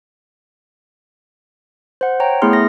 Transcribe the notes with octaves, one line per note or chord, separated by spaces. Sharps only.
C5 F#5
C#5 G5 A#5
A3 B3 E4 G#4 C6 F6
A#6